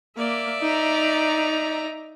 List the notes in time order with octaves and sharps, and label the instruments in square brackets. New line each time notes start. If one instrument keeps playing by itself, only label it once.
[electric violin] A#3 [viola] D5 E5
[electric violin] D#4 A#5